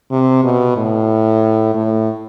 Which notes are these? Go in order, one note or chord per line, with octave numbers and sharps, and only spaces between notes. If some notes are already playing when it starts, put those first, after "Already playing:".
C3
B2
A2
A2